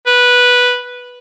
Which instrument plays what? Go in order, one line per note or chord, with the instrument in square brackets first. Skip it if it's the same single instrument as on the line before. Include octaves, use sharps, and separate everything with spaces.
[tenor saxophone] B4